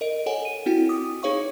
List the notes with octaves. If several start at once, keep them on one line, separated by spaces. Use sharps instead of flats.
A#4 D#5 D7
A4 C#5 F#5 G#5
D#7
C4 E4 F#4 G5
D6 D#6
D#4 G#4 C#5 F5 C#6